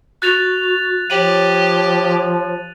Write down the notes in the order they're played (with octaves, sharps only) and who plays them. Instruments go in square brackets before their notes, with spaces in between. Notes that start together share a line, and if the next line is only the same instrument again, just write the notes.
[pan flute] F#4 [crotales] F#6 A6 F7
[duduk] F3 [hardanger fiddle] G4 [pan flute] C#5 [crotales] D#7 F#7